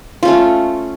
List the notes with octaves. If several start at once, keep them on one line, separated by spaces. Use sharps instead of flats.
A3 C#4 F4